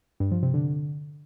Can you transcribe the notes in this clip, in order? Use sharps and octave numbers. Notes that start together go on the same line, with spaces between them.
G2
F3
C3
D3